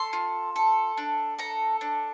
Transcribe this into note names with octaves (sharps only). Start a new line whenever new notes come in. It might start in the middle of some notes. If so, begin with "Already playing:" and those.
Already playing: A4 C6
F4
A4
D4
A4 A#5
D4